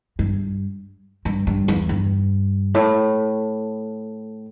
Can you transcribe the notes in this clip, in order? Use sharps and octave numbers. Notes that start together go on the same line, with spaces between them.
G2
G2
G2
E2
G2
A2